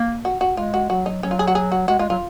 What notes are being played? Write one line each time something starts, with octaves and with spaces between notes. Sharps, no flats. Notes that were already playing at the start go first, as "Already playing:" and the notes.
Already playing: A#3
F#4
F#4
G#3 F4
F#4
F#3 F#4
D#4
F#3 C#4
F4
G#4
F#4
G#4
F#4
G#3 F#4
G#3 F4
F#3 F4